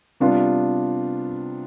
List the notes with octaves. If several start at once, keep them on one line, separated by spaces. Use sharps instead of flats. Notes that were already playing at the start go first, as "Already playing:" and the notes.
C3 G3 B3 D4 F4